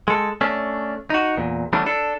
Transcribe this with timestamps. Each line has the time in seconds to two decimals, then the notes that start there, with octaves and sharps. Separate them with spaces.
0.08 G#3 A4
0.41 A3 C#4 D4
1.10 D#4 F#4
1.37 E2 A#2
1.73 E3 G3 A3 B3 C#4 D4
1.86 D4 A4